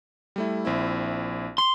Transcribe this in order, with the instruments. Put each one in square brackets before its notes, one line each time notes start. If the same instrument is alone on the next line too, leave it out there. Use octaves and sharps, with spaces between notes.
[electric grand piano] G3 A3 E4
A#1 C4 E4
[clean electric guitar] C6